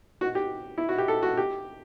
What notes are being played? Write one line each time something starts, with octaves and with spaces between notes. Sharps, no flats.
F#4
G4
E4
F#4
G4
A4
F#4
G4